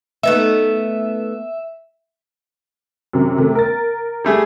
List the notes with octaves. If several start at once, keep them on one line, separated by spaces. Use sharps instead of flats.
A3 B3 D#4 E5
F#2 C3
C3 A3
A#4 A6
G3 A3 G#4